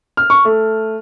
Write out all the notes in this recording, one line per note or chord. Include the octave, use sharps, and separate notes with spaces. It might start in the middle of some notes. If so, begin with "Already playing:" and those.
F6
C#6
A3